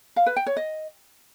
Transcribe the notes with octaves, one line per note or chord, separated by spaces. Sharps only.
F5
B4
G5
C#5
D#5